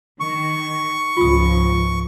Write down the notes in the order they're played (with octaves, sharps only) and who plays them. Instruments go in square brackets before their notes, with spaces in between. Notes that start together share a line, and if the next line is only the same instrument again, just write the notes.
[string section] D#3 [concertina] C#6
[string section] C#2 G#2 F3 [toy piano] F4 D#6